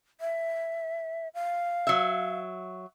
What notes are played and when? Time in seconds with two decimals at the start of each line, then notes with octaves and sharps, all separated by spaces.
0.21 E5
1.34 F5
1.87 F#3 E5